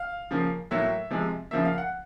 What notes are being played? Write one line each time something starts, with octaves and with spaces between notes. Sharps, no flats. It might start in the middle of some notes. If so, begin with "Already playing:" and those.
Already playing: F5
C#3 F3 A#3
A2 F#3 A#3 E5
C3 F3 G#3
C#3 F3 A#3 E5
F5
F#5